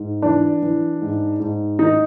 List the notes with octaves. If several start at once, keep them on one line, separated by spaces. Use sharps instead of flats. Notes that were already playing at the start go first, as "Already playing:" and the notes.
Already playing: G#2
E3 D4
E3
G#2
G#2
D#3 D#4